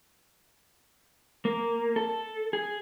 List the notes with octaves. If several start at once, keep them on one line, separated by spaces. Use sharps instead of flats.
A#3
A4
G#4